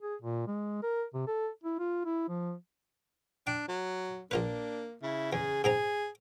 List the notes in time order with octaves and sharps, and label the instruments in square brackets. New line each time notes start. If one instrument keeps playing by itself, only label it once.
[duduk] G#4
A#2
G#3
A#4
C3
A4
E4
F4
E4
F3
[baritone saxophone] D4 [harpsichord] G5
[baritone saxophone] F#3
[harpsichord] A#1 F4 B4 [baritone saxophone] A#3 [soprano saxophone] D4
[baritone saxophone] C#3 [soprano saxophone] E4
[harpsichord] E2 [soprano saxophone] G#4
[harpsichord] G#2 C4 A#5 [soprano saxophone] G#4